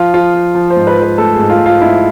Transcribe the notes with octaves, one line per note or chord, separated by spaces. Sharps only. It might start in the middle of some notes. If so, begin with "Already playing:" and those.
Already playing: F3 F4
F3 F4
F3
F3
C5
G#2
B4
F3 B4
A3 A4
G#4
G#2
F4
G#2
F4
G#2 E4